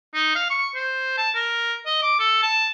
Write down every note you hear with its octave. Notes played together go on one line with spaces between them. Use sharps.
D#4
F5
C#6
C5
A5
A#4
D#5
D6
A4
A5